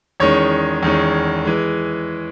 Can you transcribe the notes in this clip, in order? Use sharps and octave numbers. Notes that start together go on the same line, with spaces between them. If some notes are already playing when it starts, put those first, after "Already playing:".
E2 D#3 G#3 C#4 C#5
E2 D#3 G#3 C#4
E3 G#3